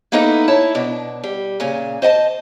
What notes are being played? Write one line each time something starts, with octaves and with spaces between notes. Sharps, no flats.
A#3 B3 D#4 E4 A4 B4
E4 C#5 E5 A5
B2 D4
G3
A#2 C#3 G#5
C5 D#5 F#5 A5